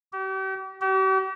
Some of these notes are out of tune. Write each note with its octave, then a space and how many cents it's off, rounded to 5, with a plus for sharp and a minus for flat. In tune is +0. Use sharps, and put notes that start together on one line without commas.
G4 -40
G4 -45